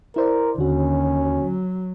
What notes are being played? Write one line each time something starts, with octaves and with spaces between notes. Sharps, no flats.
E4 A#4 C5 D5
D#2 D3 C#4 F#4
F#3